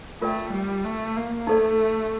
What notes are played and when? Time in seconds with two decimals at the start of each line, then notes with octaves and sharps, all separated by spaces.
0.21 A3 F4 A#4 D5 G5
0.53 G3
0.84 A3
1.16 A#3
1.47 A3 D#4 A4 D5